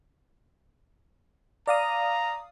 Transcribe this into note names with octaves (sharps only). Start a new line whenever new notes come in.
D5 F5 A#5 D#6